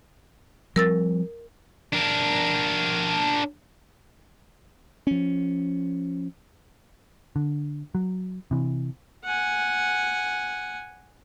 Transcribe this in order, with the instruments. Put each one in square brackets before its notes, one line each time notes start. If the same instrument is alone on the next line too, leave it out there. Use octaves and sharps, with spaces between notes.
[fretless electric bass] F3 G3 C4 [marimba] A#4 E6 A6
[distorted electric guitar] D4 A#4
[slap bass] F3 C#4
[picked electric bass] D3
F#3
C3 E3
[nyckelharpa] F#5 G#5